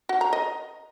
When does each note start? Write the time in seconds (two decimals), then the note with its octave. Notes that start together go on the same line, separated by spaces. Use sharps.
0.09 F#4
0.21 A#5
0.33 D#5